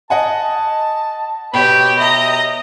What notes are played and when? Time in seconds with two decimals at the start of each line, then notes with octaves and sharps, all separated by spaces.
0.10 D#5 F#5 G#5 A5
1.53 B2 G4 B4 C#5 B5
2.00 D#5 E5 A#5